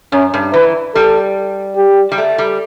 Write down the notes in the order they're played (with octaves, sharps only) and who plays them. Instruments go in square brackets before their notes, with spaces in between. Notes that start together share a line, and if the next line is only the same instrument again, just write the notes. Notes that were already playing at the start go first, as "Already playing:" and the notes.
[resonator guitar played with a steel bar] F#2 [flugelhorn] C#4
[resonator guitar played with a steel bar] G2
[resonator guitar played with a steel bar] E3 [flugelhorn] B4
[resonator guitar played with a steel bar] G3 [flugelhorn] A4
[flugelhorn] G4
[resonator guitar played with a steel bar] G3
A3
G3